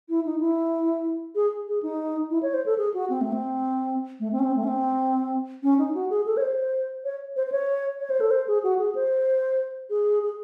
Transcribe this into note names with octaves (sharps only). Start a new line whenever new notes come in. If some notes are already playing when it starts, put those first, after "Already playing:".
E4
D#4
E4
G#4
G#4
D#4
E4
C#5
C5
A4
G#4
F#4
C4
A3
C4
A3
C4
C#4
C4
A3
C#4
C4
C#4
D#4
F#4
G#4
A4
C#5
C5
C#5
C5
C5
C#5
C#5
C5
A4
C5
G#4
F#4
G#4
C5
G#4
G#4